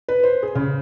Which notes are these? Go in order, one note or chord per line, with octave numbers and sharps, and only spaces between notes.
B4
C5
G#4
C#3